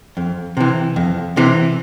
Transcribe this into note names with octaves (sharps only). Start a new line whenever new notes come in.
F2
C3 E3
F2
C3 E3